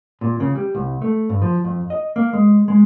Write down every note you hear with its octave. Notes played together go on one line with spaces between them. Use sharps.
A#2
C#3
G3
C2
A3
G2
F3
F2
D#5
A#3
G#3
G#3